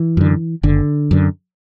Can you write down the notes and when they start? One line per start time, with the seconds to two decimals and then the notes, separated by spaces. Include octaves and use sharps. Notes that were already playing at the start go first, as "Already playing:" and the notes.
Already playing: E3
0.17 F#2 D3
0.63 F#1 D3
1.11 F#2 D3